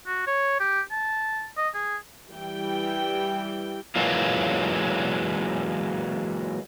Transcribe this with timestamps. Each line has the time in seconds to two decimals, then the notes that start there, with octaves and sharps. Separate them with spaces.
0.07 F#4
0.27 C#5
0.60 G4
0.91 A5
1.57 D#5
1.75 G#4
2.30 E3 G3 G5
3.96 E3 F#3 G#3 A#3 F4